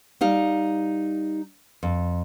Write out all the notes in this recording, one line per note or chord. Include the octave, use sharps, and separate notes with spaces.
G3 D#4 F5
F2